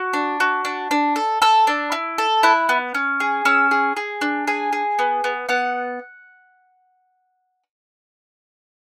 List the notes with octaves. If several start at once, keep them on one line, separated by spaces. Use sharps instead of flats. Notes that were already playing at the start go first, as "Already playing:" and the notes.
Already playing: F#4
D4
F#4
D4
D4
A4
A4 E6
D4
E4
A4
E4 F#6
B3
C#4
G#4
C#4 E6
G#4
G#4
D4
G#4 G#5
G#4
B3
B3
B3 F#5